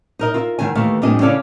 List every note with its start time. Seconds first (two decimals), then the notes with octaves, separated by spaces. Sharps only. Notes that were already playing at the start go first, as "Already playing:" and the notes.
0.19 D#4 A#4 D#5
0.34 F4 A#4 E5
0.59 E2 G#2 D#3 G#5
0.75 D#2 E3 A3 D#5 F5
1.02 F2 A2 G3 D4 D#5 G#5
1.21 C#3 C#4 E4 A4 D5 F5